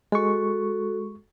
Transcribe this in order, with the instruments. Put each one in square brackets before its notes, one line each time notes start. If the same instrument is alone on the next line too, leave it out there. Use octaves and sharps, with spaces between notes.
[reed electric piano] G#3 C#6 [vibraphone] F#4 A4